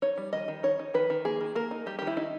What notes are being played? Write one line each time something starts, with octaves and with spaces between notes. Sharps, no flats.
D#4 C#5
G3
D#3 D#5
D#3
D#4 C#5
D#4
D#3 B4
D#3
A#3 G#4
D#3
A#3 A#4
D#4
G3 G4
G4
D#3
E4
D#4